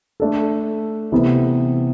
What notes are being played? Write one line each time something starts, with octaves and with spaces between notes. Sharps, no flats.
A3 D4 A4
C3 E3 B3